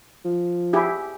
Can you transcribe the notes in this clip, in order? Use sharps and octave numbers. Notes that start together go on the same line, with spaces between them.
F3
E4 G4 G#4